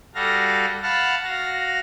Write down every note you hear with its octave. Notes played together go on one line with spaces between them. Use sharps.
G3 F#4 A4 F5 A#6
F5 F#5 A5 B5 F6
F#4 F5 A#6